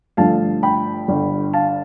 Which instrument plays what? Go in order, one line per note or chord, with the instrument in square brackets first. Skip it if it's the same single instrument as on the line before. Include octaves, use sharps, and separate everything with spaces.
[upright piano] G1 G2 F3 A3 F5 A5
G5 B5
G1 G2 D3
F5 A5